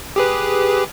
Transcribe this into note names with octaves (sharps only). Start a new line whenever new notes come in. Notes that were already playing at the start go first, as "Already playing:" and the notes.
G4 G#4 B4